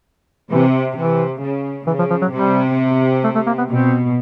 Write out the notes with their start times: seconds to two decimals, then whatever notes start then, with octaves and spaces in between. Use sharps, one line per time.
0.51 C3 E3
0.96 C3 E3
1.41 C#3
1.87 C#3 E3
1.99 F3
2.10 F3
2.22 F#3
2.32 C3 G3
3.24 A3
3.35 A3
3.47 A#3
3.58 B3
3.69 B2 C4